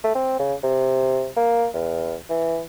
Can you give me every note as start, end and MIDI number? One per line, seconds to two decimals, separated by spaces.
0.04 0.13 57
0.15 0.39 60
0.39 0.54 49
0.63 1.28 48
1.37 1.67 58
1.74 2.16 40
2.29 2.62 52